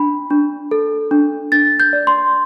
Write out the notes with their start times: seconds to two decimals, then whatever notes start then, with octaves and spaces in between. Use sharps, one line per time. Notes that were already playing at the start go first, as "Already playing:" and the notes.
Already playing: D4 B5
0.30 D4
0.71 A4
1.11 D4
1.52 D4 A6
1.80 G6
1.93 D5
2.07 C6